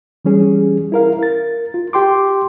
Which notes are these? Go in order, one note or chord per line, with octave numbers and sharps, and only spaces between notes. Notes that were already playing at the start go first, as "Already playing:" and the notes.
E3 G3 C#4 G#4
E4 A#4 F5
A#4 A6
F4
G4 G5 C6 D6